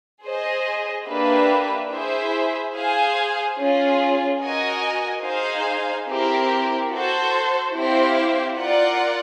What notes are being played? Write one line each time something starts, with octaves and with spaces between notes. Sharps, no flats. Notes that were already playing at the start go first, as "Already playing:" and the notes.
G#4 C5 D#5
A#3 D4 G4 B4 E5
E4 G#4 C5 E5
G#4 C5 F5 G#5
C#4 F4 G#4
F#4 A#4 D#5 G#5
D#4 G#4 C5 F5 G#5
C4 E4 G4 A#4
F#4 A4 C5
C4 E4 G4 C5 F5
F4 A#4 D5 F#5